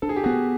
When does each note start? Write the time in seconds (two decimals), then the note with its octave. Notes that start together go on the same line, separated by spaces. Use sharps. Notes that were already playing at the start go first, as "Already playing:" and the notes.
0.02 D4 A4
0.09 G#4
0.16 G4
0.24 B3 F#4 G#4